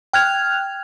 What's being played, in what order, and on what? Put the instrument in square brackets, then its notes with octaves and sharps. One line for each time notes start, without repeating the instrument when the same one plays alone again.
[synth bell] G5 F6 F#6 G#6 F7